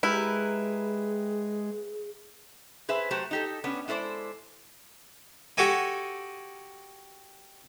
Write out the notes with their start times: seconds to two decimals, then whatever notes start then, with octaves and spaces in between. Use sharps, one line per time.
0.03 G#3 E4 G4 G#4 A#4 B4
2.89 G#4 B4 C5 E5
3.11 F#3 A3 F#4 G4 C5
3.31 D#4 G4 A4
3.64 B3 C#4 D4
3.88 G#3 E4 A4 C5 D5
5.57 F#4 G4 A4 D#5 G#5